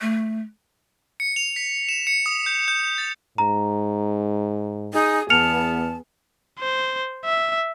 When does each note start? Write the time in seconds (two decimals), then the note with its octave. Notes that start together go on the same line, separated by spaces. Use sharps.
0.01 A3
1.20 C#7
1.36 F7
1.56 B6
1.89 E7
2.07 C#7
2.26 D#6
2.46 G6
2.68 G6
2.98 A6
3.38 G#2 A#5
4.93 D#4 G#4
5.30 E2 B3 A5 F6 C#7 F7
6.60 C5
7.25 E5